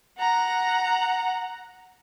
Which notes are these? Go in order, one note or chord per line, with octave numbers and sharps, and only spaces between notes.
F#5 A#5